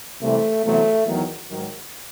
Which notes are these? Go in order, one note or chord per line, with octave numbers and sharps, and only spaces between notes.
C2 C3 E3 A3
E2 C3 F#3 A3
E2 D#3 F#3
G#2 D#3 F#3